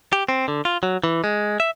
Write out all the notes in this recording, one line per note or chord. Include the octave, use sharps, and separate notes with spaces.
G4
C4
D3
F4
F#3
E3
G#3
E5